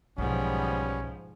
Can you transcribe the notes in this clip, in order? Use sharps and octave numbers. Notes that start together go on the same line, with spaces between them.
B1 G#2 F3 G3 B3 C#4